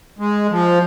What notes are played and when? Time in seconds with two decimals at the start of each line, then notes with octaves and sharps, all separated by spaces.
0.19 G#3
0.50 F3